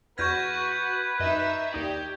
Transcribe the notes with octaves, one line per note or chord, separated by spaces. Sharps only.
E2 F#4 B4 C#6 F6 G6 G#6 A#6
F#2 D#4 D#5 E5
D#2 D#4 G4 D5